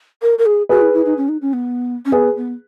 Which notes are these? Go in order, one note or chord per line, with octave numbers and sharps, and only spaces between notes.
A#4
A#4
G#4
F#4 G#4 B4
E4
E4
D#4
C#4
D#4
C#4
B3
C#4
B3 G#4 B4
B3